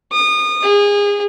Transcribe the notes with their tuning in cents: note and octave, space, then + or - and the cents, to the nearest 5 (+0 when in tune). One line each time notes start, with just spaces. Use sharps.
D#6 -30
G#4 -30